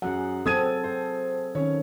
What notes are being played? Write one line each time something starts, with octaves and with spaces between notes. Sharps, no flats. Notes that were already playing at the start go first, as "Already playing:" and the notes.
F#2 G#4 F#5
F#3 C4 A4 D#6 G#6 D#7
C5
D#3 C#4 C#5